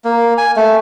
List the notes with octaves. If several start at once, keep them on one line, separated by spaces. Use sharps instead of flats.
A#3
G#5
A3